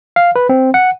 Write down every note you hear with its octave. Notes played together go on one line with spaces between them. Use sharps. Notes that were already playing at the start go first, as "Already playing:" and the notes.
F5
B4
C4
F#5